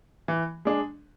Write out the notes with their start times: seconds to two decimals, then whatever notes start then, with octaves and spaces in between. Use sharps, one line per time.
0.28 E3
0.65 G#3 D4 G#4